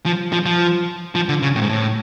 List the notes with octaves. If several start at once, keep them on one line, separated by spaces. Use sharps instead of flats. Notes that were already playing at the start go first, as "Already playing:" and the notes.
F3
F3
F3
F3
D3
C#3
A2
G#2
A2